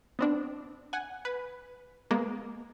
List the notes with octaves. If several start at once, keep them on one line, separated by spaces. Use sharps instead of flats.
B3 C4 D4
F#5 G#5
B4
G#3 A#3 B3